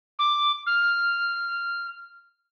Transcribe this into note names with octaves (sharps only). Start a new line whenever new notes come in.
D6
F6